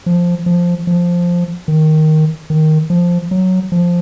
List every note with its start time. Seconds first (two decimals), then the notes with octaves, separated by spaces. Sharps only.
0.06 F3
0.46 F3
0.87 F3
1.68 D#3
2.50 D#3
2.90 F3
3.31 F#3
3.72 F3